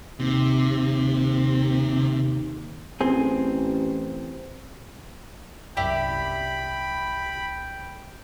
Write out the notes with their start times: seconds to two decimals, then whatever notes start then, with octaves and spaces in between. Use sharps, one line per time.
0.20 D#2 C3
3.01 A1 C4 G#4
5.77 C2 F#2 E4 G4 D5 G5 B5